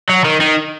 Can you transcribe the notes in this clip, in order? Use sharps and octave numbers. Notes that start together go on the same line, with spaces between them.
F#3
D#3
D#3